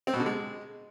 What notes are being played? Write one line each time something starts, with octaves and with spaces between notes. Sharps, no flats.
C4
B2
D3
G#3